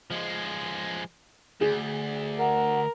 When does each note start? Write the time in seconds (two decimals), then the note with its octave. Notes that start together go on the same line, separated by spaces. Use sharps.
0.11 F3 G#3
1.61 D2 G#4
2.39 A#4 F#5